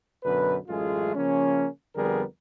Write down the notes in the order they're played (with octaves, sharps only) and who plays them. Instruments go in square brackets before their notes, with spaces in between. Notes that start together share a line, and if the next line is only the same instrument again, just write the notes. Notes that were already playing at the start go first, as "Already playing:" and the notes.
[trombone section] F#2 B2 D3 B4
A1 F#2 G#3 A3 F4 G#4
C#3 F3 A#3 C#4
F2 D3 G3 B3 G#4 A#4